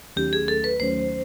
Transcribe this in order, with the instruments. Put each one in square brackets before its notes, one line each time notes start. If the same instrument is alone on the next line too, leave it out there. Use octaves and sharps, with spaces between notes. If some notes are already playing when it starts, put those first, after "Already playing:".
[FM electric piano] D#2 D#3 F#3 A3 C#4 [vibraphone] G4
[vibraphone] G#4
A4
B4
[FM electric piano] D#2 D#3 F#3 A3 C#4 [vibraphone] C5